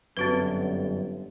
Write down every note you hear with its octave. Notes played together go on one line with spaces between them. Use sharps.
G1 F#2 C4 F#4 B4